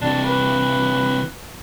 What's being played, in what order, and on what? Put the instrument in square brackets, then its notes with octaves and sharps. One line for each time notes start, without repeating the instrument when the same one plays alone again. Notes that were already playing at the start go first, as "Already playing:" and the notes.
[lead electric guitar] C3 E3 [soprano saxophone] D4
[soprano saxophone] B4